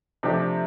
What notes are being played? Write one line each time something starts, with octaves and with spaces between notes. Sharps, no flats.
C3 F3 A3 D4 G4